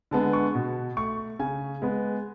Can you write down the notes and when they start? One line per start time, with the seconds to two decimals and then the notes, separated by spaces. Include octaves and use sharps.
0.11 D3 G#3 B3 A5
0.33 C#6
0.55 B2
0.97 A3 C#6
1.39 C#3 G#5
1.82 G#3 B3